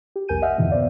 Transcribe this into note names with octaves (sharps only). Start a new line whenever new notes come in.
G4
B1 E2 A#4 G#5 G6 D#7
D#5 E5 F#5 F6
F2 G#2 B2 D3 E3 F3
B3 C5 D5 F5